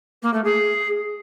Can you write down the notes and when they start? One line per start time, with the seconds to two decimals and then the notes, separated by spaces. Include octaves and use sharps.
0.22 A#3
0.33 A3
0.44 G#4